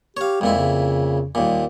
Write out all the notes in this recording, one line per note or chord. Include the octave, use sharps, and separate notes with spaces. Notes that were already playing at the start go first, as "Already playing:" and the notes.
G4 C#5 F5
F2 A#2 G#3 E4
C#3
D#2 A#2 G3